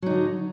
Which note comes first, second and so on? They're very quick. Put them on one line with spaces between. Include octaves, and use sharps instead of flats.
F#3 D#4 D3